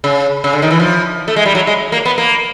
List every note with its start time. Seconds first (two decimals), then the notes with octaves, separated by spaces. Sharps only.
0.04 C#3
0.44 C#3
0.53 D3
0.62 D#3
0.71 E3
0.80 F3
1.28 A3
1.36 G#3
1.46 G3
1.55 F#3
1.67 G#3
1.92 A#3
2.05 B3
2.18 A#3